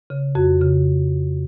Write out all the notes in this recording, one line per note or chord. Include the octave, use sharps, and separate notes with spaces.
C#3
F2 F#4
C#3